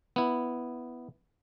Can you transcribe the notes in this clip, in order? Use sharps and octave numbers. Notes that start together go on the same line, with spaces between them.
B3 E4